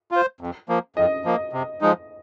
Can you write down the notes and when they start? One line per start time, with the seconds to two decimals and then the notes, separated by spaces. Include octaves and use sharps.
0.11 F4 C5
0.41 F2
0.69 F3 A#3
0.96 F2 D#5
1.25 F3 A#3
1.53 C3
1.81 F3 G#3 D#4